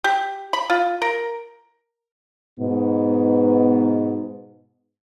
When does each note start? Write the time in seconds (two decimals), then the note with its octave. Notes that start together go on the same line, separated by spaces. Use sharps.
0.04 G4
0.53 B5
0.70 F4
1.02 A#4
2.59 G#2 B2 B3